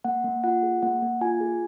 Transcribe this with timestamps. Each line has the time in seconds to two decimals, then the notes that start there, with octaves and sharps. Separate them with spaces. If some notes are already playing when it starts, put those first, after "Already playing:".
0.04 A#3 F#5
0.24 A#3
0.44 F4 F#5
0.63 G#4
0.82 A#3 F#5
1.02 A#3
1.21 F4 G#5
1.41 G#4